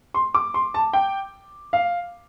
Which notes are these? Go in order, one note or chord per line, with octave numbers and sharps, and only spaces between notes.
C6
D6
C6
A5
G5
F5